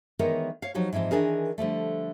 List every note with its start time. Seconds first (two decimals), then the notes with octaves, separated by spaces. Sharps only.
0.19 D#3 E3 G#3 B3 A#4 C#5
0.62 C#5 F5
0.74 F3 F#3 D#4 F#4 G4
0.93 G#2 E3 F3 C4 D#5
1.11 D#3 E3 D4 G#4 A#4
1.58 D3 F3 G3 A3